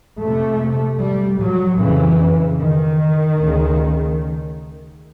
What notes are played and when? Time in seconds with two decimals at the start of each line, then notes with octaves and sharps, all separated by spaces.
0.19 F2 C3 A3
0.99 G3
1.39 F#3
1.79 F2 C#3 E3
2.60 D#3
3.40 D2 C#3